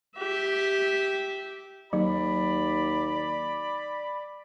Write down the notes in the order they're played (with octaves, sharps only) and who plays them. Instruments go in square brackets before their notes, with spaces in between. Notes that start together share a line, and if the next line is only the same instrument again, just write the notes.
[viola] G4 E5
[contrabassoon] D#2 [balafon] F#3 [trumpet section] D5 B5